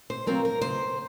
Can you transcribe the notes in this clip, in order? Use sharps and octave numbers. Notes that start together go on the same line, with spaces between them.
C5
F#3 C4 F4 A#4
A#4
C#3 C5